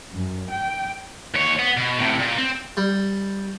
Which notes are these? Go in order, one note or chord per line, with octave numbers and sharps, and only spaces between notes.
F#2
G5
D#2 C#5
B3
B2
A2 C3
A#2
C4
G3